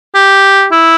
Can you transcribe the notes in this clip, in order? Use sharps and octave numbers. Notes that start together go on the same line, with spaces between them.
G4
E4